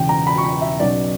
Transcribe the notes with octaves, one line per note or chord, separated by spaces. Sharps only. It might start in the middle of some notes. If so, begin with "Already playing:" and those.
Already playing: E1 E2 C#3 G5
A#5
B5
C#6
B5
E5
B1 B2 F#3 C#4 D5